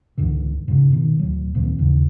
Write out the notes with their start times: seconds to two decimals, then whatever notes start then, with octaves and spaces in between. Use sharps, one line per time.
0.18 C#2 G#2 D3 E3
0.68 G#2 C#3
0.92 B2 D#3
1.19 D1 F#3
1.54 D1 A#2 D#3 C4
1.78 D#2 G#2 C#3 E3